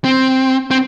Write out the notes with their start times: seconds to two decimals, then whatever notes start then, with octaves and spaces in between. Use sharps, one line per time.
0.04 C4
0.71 C4